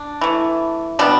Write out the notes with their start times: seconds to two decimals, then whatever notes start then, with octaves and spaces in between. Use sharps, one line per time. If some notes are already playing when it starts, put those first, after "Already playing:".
Already playing: D4
0.21 E3 A3
0.99 B2 G3 B3 D4